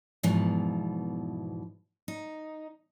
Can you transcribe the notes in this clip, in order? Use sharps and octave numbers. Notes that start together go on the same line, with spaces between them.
E2 G#2 B2 E3 F3
D#4